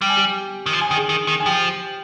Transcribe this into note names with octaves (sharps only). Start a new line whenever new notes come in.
G3 G5
G#5
G4 G5
D#3
F3
G#5
D#3 G5
G#4 G#5
D#3
D#3
G#5
F3 G4 G5